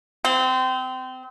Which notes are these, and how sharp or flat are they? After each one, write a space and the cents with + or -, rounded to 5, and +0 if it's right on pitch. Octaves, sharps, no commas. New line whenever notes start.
C4 -25